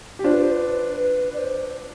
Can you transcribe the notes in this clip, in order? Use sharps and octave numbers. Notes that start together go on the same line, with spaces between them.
G4
D4 F4 C5
B4
C5
B4
B4
D5
C5